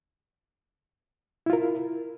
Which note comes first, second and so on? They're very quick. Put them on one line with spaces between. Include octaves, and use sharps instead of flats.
E4 F4 A#4